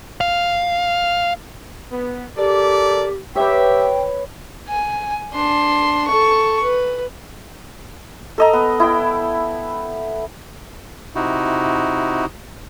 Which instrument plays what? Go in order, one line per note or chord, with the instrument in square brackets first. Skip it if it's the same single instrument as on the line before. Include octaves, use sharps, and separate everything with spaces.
[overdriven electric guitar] F5
[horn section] B3
[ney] G4 [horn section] A4 A#4 D5
[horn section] G4 E5 [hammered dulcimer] B4 C#5 [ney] G5
[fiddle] G#5
D4 C6
A4 C#6
B4
[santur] A4 D#5 A#5
B3
E4 G5
[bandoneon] C3 D#4 E4 F#4